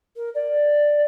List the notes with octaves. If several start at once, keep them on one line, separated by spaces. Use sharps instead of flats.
A#4
D5